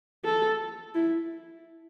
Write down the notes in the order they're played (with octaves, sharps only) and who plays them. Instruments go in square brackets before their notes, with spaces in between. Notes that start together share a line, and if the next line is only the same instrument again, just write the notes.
[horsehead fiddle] A4
E4